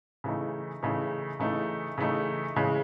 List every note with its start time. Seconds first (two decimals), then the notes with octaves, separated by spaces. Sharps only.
0.24 C#3 E3 A3 D#4
0.83 C#3 E3 A3 D#4
1.40 C#3 E3 A3 D#4
1.98 C#3 E3 A3 D#4
2.56 C#3 E3 G#3